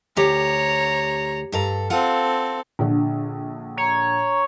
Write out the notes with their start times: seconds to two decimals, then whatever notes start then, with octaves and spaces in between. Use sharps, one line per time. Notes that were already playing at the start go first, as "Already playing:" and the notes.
0.17 D2 G4 C#5 A#5
1.52 G2 A4 A#5
1.90 C4 F4 A4 F5 F#5
2.79 A#1 D3
3.77 C#5 A#5